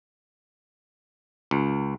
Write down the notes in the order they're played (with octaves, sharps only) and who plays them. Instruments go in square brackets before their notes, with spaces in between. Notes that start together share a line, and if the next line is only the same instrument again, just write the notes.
[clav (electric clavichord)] C#2